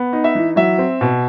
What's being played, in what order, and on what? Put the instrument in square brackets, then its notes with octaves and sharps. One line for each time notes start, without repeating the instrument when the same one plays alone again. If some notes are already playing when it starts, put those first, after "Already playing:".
Already playing: [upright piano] B3
D#4
E5
E3
F#3 E5
C4
B2